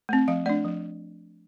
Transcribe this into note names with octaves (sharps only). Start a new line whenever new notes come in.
A3 C4
F3 F5
A3 D4 D5
F3